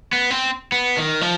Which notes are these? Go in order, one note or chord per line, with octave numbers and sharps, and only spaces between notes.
B3
C4
B3
D#3
F3